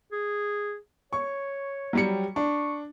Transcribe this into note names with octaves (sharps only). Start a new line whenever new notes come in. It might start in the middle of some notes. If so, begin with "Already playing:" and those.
G#4
C#5 C#6
F#3 G3 C#7
D4 C#6